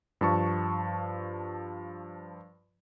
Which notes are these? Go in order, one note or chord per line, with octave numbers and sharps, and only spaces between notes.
G2 F3 A5 C#6